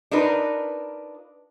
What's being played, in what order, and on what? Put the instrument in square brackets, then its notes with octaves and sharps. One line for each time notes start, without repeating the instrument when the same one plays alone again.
[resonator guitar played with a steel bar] D4 D#4 F4 A#4 B4